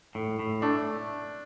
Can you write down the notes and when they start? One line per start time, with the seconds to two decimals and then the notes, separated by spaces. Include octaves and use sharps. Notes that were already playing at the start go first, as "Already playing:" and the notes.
0.15 A2
0.39 A2
0.62 A3 D4